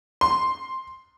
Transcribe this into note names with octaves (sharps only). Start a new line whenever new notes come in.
C6